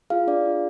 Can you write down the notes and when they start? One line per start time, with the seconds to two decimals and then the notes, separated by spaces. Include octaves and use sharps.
0.10 F4 G#4 F5
0.27 D4 D5
0.46 F4 G#4